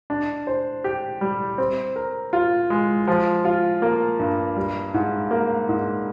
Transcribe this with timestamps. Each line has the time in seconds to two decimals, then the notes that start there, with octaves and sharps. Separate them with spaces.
0.10 D4
0.47 C5
0.84 G4
1.21 G3
1.58 C4
1.96 A#4
2.33 F4
2.70 G#3
3.07 F3
3.45 F4
3.82 A#3
4.19 G2
4.56 G3
4.94 G#2
5.31 A#3
5.69 G#2